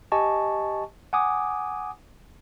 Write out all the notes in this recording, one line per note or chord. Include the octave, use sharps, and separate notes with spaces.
G4 D#5 G#5 A5 C#6
F#5 G#5 D6 D#6